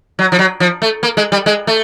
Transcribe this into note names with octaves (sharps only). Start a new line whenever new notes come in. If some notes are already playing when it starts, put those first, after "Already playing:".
F#3
F3
F#3
F3
A3
A#3
G#3
G3
G#3
A3